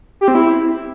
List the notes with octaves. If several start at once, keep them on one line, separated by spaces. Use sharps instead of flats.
G4
C4
E4